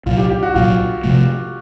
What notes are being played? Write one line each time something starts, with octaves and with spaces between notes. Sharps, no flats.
C2 A#2 F#3 F4
G4
G4
F#4
C2 A#2 F#3 F4
C3 F3 A3